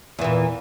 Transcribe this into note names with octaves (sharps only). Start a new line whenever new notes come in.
E2 A#2 E3